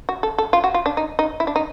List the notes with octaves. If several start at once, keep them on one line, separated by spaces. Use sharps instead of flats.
F#4
A4
A4
F4
F#4
F4
D4
D#4
D#4
E4
D4
D#4